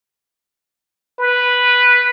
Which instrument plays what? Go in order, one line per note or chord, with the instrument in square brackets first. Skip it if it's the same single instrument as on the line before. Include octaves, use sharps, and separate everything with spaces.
[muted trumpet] B4